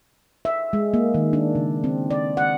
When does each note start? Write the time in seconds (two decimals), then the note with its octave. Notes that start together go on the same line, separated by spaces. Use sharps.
0.45 E5
0.73 G#3
0.94 A#3
1.14 D#3
1.33 D4
1.55 C#3
1.84 C4
2.11 D5
2.37 F#5